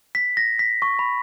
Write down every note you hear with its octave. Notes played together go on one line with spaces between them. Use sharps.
B6
A#6
B6
C#6
B5